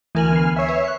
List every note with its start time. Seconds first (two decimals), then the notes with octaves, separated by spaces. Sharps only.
0.15 D2 E3 A#4 G#5 F6 F#7
0.32 B3 C7
0.56 C#5 E5
0.69 B4
0.84 C#6 F#6